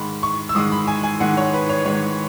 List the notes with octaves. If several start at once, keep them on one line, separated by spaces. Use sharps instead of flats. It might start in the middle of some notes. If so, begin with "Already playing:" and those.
Already playing: G#2 D#3 G#3 B5
C#6
E6
G#2 D#3 G#3 D#6
B5
G#5
G#5
G#2 D#3 G#3 F#5
C#5
B4
C#5
G#2 D#3 G#3 C#5